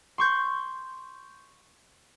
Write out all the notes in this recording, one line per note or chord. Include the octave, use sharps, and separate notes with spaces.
C6 C#6 G6